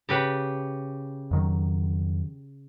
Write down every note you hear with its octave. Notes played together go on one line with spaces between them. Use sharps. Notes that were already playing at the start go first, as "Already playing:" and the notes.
C#3 G4 B4
F2 D#3 F#3